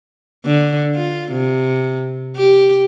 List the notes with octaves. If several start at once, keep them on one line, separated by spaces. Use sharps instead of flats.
D3
F4
C3
G4